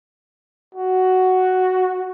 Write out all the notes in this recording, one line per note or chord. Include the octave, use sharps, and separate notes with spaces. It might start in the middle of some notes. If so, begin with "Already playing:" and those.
F#4